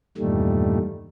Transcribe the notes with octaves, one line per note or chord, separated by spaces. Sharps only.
E2 G2 A#2 D#3 G3 A3